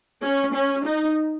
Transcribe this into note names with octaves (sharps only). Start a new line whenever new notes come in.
C#4
C#4
D#4